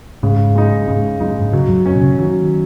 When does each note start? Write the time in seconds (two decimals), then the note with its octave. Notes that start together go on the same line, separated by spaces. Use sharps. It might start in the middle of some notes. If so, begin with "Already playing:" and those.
0.23 G#2 C#3
0.55 G#3 D#4
0.88 G#2 C#3
1.20 F#2 G#3 D#4
1.37 G#2
1.53 C#3 F#3
1.66 G#2
1.69 F#2
1.86 C#4
1.95 B2
2.01 C#3
2.18 D#3 F#3